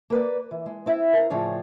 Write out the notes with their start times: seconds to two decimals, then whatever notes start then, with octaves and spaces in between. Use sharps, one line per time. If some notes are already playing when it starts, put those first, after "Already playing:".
0.10 A#3 B4 D5
0.51 E3
0.66 G#3
0.86 C4 E4
1.13 A#4 C5
1.30 A2 C#3 F3 G#4 C#5 D5